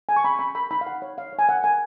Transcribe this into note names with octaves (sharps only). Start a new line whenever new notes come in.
G#4 G#5
C#6
C#4 B5
C#4 B5
A#4 B5
D#4 B5
F5
D#4 F#5
C#5
D#4 F5
C#5
G#5
A#4 F#5
A#4 G#5